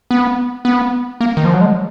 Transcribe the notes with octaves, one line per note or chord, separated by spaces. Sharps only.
B3
B3
A#3
D#3
F3
F#3
G#3